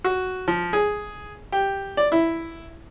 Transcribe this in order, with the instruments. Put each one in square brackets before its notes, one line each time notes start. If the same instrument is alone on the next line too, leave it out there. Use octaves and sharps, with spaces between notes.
[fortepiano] F#4
F3
G#4
G4
D5
E4